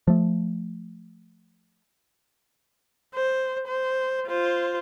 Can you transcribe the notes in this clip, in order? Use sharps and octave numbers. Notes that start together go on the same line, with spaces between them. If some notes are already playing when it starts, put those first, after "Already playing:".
F3 A3
C5
C5
F4 C5